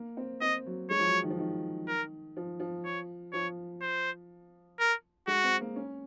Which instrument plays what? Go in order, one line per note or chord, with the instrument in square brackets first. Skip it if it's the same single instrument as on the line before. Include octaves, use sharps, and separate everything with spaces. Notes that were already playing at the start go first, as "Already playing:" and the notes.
Already playing: [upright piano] A#3
C4
[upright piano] C4 [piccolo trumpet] D#5
[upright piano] F#3
[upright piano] G#3 [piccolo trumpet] C#5
[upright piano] F3
F#3
D#3
F3
D#3
[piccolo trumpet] A#4
[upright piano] F3
F3
[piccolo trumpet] C#5
[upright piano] F3 [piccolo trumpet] C#5
[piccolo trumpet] C5
A#4
[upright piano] G#3 [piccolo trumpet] F#4
[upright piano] C4
A#3
C#4